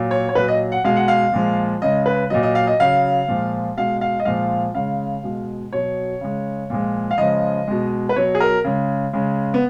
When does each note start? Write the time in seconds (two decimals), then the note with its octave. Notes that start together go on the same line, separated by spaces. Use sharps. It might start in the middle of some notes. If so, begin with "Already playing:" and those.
Already playing: A#2 F#3
0.11 C#5
0.29 C#5
0.35 A#2 F#3 B4
0.48 D#5
0.72 F#5
0.84 B2 G#3 F5
0.96 F#5
1.08 F5
1.33 A#2 F3 G#3
1.82 C#3 G#3 D#5
2.06 B4
2.30 A#2 F#3 D#5
2.43 D#5
2.55 F5
2.67 D#5
2.80 C#3 F#3 F5
3.28 A#2 F3 G#3
3.77 B2 G#3 F5
4.01 F5
4.20 D#5
4.25 A#2 F3 G#3 F5
4.75 C#3 G#3 F5
5.23 B2 G#3
5.73 B2 F#3 C#5
6.21 C#3 G#3
6.70 A#2 F3 G#3
7.11 F5
7.18 C#3 F3 G#3 D#5
7.68 B2 G#3
8.09 B4
8.16 B2 F#3 C#5
8.35 G#4
8.40 A#4
8.64 C#3 G#3
9.13 C#3 G#3
9.54 B3